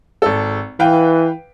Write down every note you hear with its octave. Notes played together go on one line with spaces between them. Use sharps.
G#1 A4
E3 B4 F5 G5